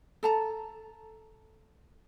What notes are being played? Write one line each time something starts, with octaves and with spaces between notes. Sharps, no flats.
A4 A5 A#5